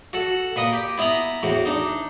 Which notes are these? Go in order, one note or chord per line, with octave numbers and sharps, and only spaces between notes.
F#4 A4 F#5
A#2 B4 D#5 D#6
G4
B3 E4 D#5 A#5 B5
E2 A2 F#4
D4 D#4